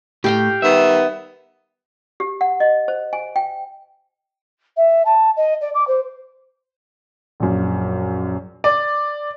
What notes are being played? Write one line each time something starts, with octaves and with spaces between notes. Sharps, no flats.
A2 G4 F5 G5
D#3 G3 B3 E5
G4
F#5
D#5
C5
G#5
G5
E5
A5
D#5
D5
D6
C5
A#1 F#2
D5